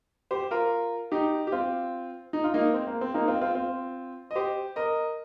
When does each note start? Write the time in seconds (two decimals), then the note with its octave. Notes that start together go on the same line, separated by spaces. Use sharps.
0.31 G4 C5
0.51 F4 A#4
1.12 D#4 G4
1.47 G4
1.52 C4 F4
2.33 D#4
2.44 F4
2.54 A#3 D#4
2.74 C4
2.87 A#3
3.01 C4
3.14 A#3 D#4
3.28 C4 F4
3.41 C4 F4
3.55 C4 F4
4.31 D#5
4.35 G4 C5
4.76 A#4 D#5